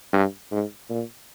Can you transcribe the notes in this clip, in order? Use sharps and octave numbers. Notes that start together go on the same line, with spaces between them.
G2
G#2
A#2